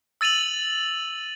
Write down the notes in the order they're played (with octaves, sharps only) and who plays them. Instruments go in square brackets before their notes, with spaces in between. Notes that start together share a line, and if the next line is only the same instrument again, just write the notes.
[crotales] E6 A6 D#7 F7 F#7